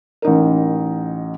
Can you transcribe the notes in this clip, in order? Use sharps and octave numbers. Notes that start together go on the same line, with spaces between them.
A1 D#4 A#4